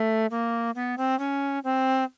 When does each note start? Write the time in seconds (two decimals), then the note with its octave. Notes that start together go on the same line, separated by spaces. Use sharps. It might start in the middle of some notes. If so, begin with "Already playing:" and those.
Already playing: A3
0.31 A#3
0.75 B3
0.98 C4
1.19 C#4
1.64 C4